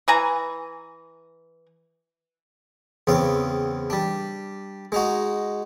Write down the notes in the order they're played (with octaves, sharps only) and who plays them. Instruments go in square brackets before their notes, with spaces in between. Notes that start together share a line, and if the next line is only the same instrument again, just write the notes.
[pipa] E3 G#5 A#5
[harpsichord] E2 C#3 C4 F5
G3 D4
G#3 D#4 F#4